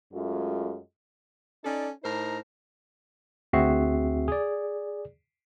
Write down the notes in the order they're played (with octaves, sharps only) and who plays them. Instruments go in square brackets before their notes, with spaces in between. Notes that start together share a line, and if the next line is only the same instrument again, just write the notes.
[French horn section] F#2 G#3 A3 F4
[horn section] C#4 D#4 A4 D5
A2 D#4 A#4 C5 A#5
[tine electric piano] D2 C4 F#4 G#4 E5 C7
G#4 D5